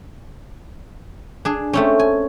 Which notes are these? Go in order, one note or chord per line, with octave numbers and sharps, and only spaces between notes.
D4 G#4
A3 C4 C#4
G#5